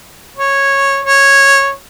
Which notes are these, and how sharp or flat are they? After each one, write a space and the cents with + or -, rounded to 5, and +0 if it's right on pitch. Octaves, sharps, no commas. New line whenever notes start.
C#5 -10
C#5 -10